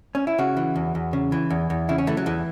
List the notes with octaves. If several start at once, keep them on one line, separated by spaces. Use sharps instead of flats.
C#4
E4
C#3 F#4
E3
E2
E2
C#3
E3
E2
E2
C#3 E4
C#4
E3 A3
F#3
E2 E3